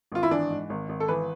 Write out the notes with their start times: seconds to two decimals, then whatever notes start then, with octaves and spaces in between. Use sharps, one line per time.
0.12 G#1 F4
0.23 E4
0.31 E3 D4
0.50 G#2
0.70 G#1
0.89 G#1
1.00 A4
1.08 E3 B4